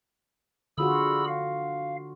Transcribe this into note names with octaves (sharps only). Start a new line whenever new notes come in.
D3 F4 F#4 G#4 B5 E6
F5